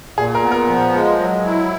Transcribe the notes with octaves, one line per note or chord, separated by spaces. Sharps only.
A#2 G#4
A#4
B3
A#4
F3
G#3
F#3
E4